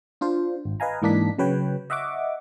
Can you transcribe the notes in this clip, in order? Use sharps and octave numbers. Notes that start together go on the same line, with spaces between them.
D4 F4 C5
G#1
B4 D#5 F5 G#5 A#5
G#2 E3 A#3 D4 D#4 B6
C#3 F#3 B4 C#5 G5
D#5 E5 F#5 C#6 D6